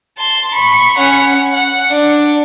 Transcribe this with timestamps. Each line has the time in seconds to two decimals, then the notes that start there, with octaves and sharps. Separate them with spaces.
0.18 A5 C6
0.54 B5 C#6
0.97 C#4 F#5
1.53 F#5
1.90 D4